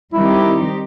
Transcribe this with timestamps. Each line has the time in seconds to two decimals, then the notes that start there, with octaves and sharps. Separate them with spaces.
0.13 D#3 G3 C4 D#4 E4 G4